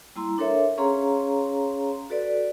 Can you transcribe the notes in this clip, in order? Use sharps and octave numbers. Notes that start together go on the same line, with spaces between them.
G3 A#3 E4 A#5 C6
D4 A4 A#4 C#5 E5
C#4 G#4 C#5 F5 A#5 C6
F#4 A4 B4 D5